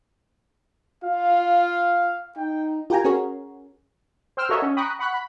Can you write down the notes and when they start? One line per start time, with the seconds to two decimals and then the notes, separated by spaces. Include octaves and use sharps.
1.04 F4 F5
2.37 D#4 G5
2.90 F4 G4 A#4 G5 G#5 A#5
3.05 C#4 F#4 G#4 A#4 C#5
4.37 C5 G5 E6 F6
4.49 F#4 A4 A#4 C#5 D#5 E5
4.62 C#4
4.77 G5 A#5 B5 C#6 D#6 F#6
4.99 F#5 B5 C#6 F#6
5.14 B5